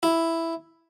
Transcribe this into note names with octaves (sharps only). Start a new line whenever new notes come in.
E4